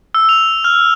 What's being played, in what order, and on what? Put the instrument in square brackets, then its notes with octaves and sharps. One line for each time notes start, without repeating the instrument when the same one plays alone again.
[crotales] E6
F7
F6